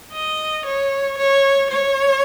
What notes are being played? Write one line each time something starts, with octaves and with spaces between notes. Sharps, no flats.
D#5
C#5
C#5
C#5